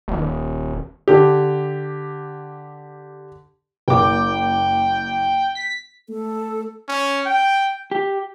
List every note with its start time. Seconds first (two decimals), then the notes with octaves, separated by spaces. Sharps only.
0.08 D#1
1.08 D3 G4
3.88 F#1 G5 D6
5.55 B6
6.09 A3 A4
6.89 C#4
7.26 G5
7.91 G4